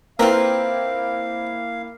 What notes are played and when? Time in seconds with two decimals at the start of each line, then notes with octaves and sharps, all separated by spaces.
0.19 A#3 C4 E4 F4 A#4 B4 F5 G5